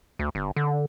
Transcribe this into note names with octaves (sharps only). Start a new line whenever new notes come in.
D2
G1
D3